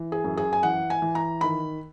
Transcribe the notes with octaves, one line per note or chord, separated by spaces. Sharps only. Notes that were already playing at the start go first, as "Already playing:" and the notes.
Already playing: E3
G#4
F#2
G#4
G#5
E3 F#5
G#5
E3
A#5
D#3 B5